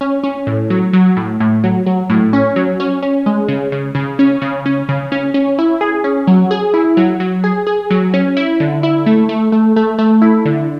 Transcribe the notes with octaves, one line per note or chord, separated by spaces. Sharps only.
C#4
C#4
A2
F#3
F#3
A2
A2
F#3
F#3
A2
C#4
F#3
C#4
C#4
G#3
C#3
C#3
C#3
C#4
C#3
C#4
C#3
C#4
C#4
E4
G#4
C#4
F#3
G#4
E4
F#3
F#3
G#4
G#4
F#3
C#4
E4
D3
E4
A3
A3
A3
A3
A3
E4
D3